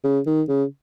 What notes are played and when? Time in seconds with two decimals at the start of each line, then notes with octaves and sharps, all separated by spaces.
0.04 C#3
0.27 D#3
0.49 C#3